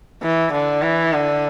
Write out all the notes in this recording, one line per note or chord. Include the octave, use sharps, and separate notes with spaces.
E3
D3
E3
D3